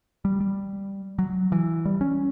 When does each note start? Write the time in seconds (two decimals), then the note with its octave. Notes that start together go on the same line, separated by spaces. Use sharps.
0.25 G3
0.40 G3
1.19 F#3
1.52 E3
1.85 G3
2.01 C#4